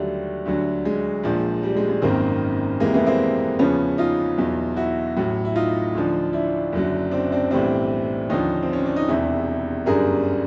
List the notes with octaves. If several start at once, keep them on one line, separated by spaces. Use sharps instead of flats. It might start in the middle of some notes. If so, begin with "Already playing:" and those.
Already playing: D#2 D3 F#3 G3 A3
D2 D3 F#3
G#3
A#1 A#2 F3
G3
G#3
G#3
G#1 F#2 D#3 A#3 C4
F2 C3 E3 G3 G#3 A#3
A3 B3
A#3 C4
E2 C#3 F3 B3 C#4
D#4 F4
E2 B2 F#3
E4 F#4
A1 A2 F#3
E4
D#4 F4
D2 D3 F3
D4 E4
F#1 F#2 D3 F#3
C4 D4
C4 D4
B1 A2 E3 G3 C4 D4
D#2 D3 F3 C#4 D#4
C4
C#4
D4
D#4
E1 E2 C3 D4 E4
G1 F#2 D3 G3 G#4 A#4